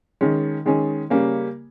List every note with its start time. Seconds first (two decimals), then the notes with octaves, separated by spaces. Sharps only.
0.21 D#3 G#3 C#4
0.66 D#3 G#3 C#4
1.10 C#3 G3 A#3 C#4